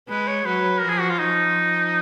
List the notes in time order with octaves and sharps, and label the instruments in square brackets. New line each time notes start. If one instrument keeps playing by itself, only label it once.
[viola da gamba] G#3 [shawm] B4
[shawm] C#5
[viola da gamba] F#3 [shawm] B4
[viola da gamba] F3 [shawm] A#4
[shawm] G#4
F#4
F4
[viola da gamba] F3 [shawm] D#4